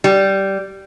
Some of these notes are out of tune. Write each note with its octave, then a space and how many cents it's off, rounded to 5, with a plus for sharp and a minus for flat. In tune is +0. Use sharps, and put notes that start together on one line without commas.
G3 -10